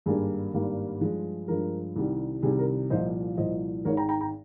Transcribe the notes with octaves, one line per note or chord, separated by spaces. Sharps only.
G#1 G2 G3 A#3 G#4
G#1 G2 G3 A#3
G2 F3 G#3
G2 F3 G#3 A#4
C2 C3 D#3 G3
C2 C3 D#3 G3 G#4
A#4
C2 A#2 F3 C5 D#5
C2 A#2 F3 C5 D#5
G#1 G#2 D#3 G#3 A#4 C#5
G5 A#5
G5 A#5
G5 A#5